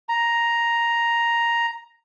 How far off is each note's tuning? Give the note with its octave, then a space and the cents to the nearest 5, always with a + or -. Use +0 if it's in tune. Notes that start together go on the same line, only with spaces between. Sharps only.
A#5 +5